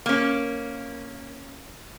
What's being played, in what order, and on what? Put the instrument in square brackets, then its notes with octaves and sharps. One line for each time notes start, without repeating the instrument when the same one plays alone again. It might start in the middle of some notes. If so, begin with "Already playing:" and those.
[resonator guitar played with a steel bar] A#3 C#4